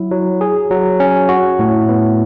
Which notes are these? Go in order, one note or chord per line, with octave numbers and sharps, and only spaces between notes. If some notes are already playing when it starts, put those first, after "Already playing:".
Already playing: F#3 E4
F#3
G#4
F#3
C#4
F#4
A2
B3